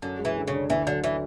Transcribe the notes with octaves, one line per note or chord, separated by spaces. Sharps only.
F#2 D3
G#3
E3
D3
C#3
D4
D2 E3
D3 F#3
D3 E3